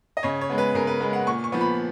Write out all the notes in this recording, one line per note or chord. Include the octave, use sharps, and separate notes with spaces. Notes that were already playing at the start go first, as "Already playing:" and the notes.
D#5
C#3 C#5
C#5
G#3 B3
B4
C#3 A#4
B4
G#3 B3 B4
F#5
A#2 C#6
C#6
F3 B3
B5